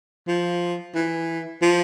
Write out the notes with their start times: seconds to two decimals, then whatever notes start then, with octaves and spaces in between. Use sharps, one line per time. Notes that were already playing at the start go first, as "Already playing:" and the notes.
0.28 F3
0.95 E3
1.62 F3